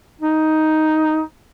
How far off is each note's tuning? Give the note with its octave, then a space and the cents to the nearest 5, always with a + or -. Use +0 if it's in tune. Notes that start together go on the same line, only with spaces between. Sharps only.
D#4 +5